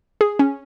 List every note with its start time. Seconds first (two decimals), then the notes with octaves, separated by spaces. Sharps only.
0.21 G#4
0.39 C#4